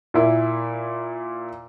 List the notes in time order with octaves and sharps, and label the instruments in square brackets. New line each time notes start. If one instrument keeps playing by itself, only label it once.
[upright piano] A#2 E4